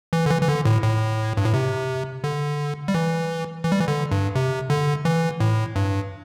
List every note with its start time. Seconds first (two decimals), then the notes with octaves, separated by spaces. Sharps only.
0.13 E3
0.26 D3
0.31 E3
0.42 E3
0.48 D3
0.65 A2
0.83 A2
1.37 G2
1.45 A2
1.54 C3
2.24 D3
2.88 G3
2.94 E3
3.64 E3
3.72 G3
3.80 E3
3.88 D3
4.11 G2
4.35 C3
4.70 D3
5.05 E3
5.40 A2
5.76 G2